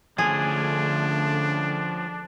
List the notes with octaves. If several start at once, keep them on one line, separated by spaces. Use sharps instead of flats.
D3 F3 A3 C#4 D4 G#4